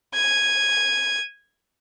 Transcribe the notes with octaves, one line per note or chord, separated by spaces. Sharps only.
G#6 D#7